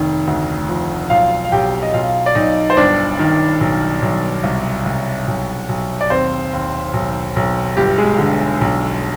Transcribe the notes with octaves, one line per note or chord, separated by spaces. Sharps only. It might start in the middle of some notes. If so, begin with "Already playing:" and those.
Already playing: F1 D#3
D2
F3
B1 F4 F5
F5
B1 G4 G5
D#5
B1 F4 F5
D5
B1 D#4 D#5
C5
G1 D4 D5
D#3
B1
B1
C2
C2
B1
B1
D5
D#2 C4 C5
D#2
B1
B1
G1 G4
G#3 G#4
D3
B1